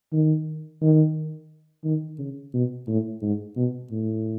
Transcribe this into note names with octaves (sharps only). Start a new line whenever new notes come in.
D#3
D#3
D#3
C#3
B2
A2
G#2
B2
A2